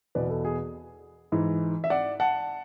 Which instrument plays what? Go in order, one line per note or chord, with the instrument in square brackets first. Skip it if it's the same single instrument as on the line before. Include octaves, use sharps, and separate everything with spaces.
[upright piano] E2 B2 B4 D5
A4
G#4
G#2 E3
E5
D5 F#5
F#5 A5